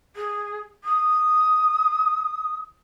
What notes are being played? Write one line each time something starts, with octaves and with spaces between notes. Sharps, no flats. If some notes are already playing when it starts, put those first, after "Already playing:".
G#4
D#6